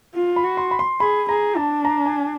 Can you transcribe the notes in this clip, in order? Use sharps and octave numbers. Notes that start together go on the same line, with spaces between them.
F4
B5
F#4
C6
B5
C6
G#4 B5
G#4 A#5
D4 A5
A#5
G#5